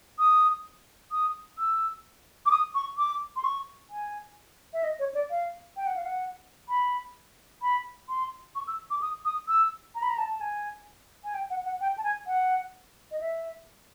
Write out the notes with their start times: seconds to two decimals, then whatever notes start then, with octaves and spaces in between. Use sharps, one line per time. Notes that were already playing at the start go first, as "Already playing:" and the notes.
0.19 D#6
1.12 D#6
1.58 E6
2.46 D6
2.51 D#6
2.75 C#6
2.98 D6
3.36 C6
3.44 C#6
3.90 G#5
4.73 E5
4.84 D#5
4.99 C#5
5.14 D5
5.30 F5
5.77 G5
5.87 F#5
5.96 F5
6.05 F#5
6.69 B5
7.62 B5
8.09 C6
8.55 C#6
8.67 E6
8.90 D6
9.02 D#6
9.25 D#6
9.48 E6
9.95 A#5
10.02 B5
10.10 A#5
10.18 A5
10.30 A5
10.41 G#5
11.24 G#5
11.34 G5
11.50 F#5
11.65 F#5
11.81 G5
11.98 A5
12.04 G#5
12.27 F#5
13.11 D#5
13.20 E5